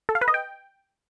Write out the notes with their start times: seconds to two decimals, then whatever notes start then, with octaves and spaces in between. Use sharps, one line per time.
0.09 A4
0.15 F5
0.21 B4
0.28 D#5
0.34 G5